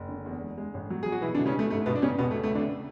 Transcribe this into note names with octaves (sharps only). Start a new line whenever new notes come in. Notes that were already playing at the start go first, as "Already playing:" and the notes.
Already playing: F#1
D3
E2
G#3
G#3
A1
F#3
F#3 G#4
F#4
B2 E3 E4
D3 D4
B2
C#3 C#4
G#3 A3
G#2 A3
G#2 B2 B3
D4
A1 C#3 C#4
E1 B2 B3
A3
C#3
A3
C#3
D3 D4